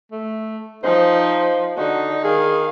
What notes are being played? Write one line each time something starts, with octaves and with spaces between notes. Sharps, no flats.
A3
F3 D#4 C5
D3 D#4 F#4
D#3 G#4 F5